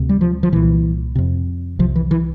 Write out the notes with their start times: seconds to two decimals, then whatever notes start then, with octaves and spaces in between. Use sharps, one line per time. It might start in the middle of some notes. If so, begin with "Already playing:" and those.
Already playing: D2 C3
0.09 G3
0.21 F3
0.43 F3
0.52 C2 A#2 E3
1.15 F2 C3
1.79 C2 C3 F3
1.96 E3
2.11 E3